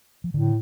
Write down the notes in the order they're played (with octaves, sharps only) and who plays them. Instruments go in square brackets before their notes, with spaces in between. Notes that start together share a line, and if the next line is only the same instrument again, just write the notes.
[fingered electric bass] F3
[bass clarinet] A2 [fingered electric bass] D3